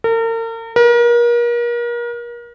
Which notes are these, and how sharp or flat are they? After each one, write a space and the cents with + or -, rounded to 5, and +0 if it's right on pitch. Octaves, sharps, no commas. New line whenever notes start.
A#4 -40
A#4 +35